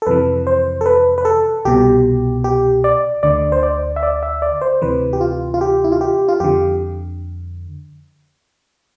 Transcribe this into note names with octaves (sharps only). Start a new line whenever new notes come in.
A4
F2 C3 E3 B4
C5
A4
B4
B4
A4
C2 B2 G4
G4
D5
D2 D3 D5
C5
D5
E5
D5
E5
D5
C5
D2 C3 E3 B4
G4
F4
F4
G4
E4
F4
G4
F4
F2 D3 G4